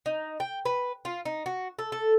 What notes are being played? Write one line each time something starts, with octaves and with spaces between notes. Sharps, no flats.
D#4
G5
B4
F4
D#4
F#4
A4
A4